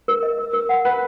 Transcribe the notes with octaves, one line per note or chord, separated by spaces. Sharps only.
A#4
D#5
A#4
A#4
F#5
B4 F#5